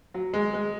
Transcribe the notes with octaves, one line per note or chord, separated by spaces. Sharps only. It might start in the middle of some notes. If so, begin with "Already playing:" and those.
F#3
G#3
G#3